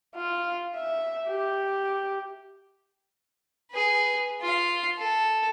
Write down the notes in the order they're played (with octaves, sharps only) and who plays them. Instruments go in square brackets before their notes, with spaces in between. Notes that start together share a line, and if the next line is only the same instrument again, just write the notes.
[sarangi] F4
E5
G4
[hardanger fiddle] G#4 B4
F4 F5
A4